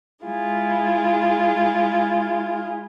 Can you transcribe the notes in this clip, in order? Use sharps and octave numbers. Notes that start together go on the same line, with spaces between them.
G#3 E4 F4 G#4